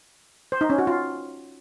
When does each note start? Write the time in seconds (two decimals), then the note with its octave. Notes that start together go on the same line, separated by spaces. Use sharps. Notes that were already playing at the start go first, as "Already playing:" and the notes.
0.52 C5
0.61 D#4
0.70 C#4
0.78 F#4
0.87 F4